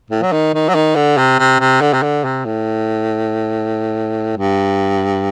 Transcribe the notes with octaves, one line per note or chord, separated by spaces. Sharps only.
A2
F#3
D#3
D#3
F#3
D#3
D3
C3
C3
C3
D3
C3
D3
C3
A2
G2